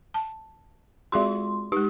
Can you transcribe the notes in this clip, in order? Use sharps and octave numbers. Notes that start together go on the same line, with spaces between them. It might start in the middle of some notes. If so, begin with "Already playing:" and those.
A5
G#3 F4 F#4 G#4 D5 C6
G#3 D#4 G4